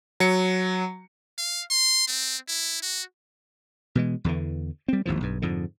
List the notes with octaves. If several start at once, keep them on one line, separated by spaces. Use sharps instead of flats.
F#3 C#7
F5
C6
C4
E4
F#4
B2 E3 G#3
E2 D3 E3
G3 C4
G#1 D#2 A2 F3
B1 G2
F2 G#2 D3